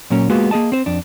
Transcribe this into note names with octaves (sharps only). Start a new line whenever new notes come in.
A#2 F#3 A#3 C#4
G#3 A#3 B3 F4 F#4 G#4
A#3 G#4 D#5 A5
C4 C5
F2 D4